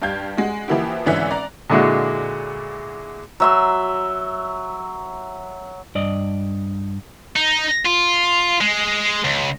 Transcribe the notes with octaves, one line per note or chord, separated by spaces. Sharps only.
G2 G4 F5 G6 G#6
G#3 F#4
E3 F3 A#3 E4 F#4 G4
G#1 D3 E3 C#4 E5 F#6
D5 A#5
A#2 D3 G#3 E4 F#4
F#3 E5 C6
G2 D5 D#5
D#4
F4
G#3
C#2